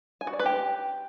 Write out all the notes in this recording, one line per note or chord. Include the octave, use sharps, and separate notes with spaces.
G#5
F#4
D5
B4
G4